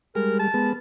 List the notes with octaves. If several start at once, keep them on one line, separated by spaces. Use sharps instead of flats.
G3 G#3 A#4
A5
G#3 B3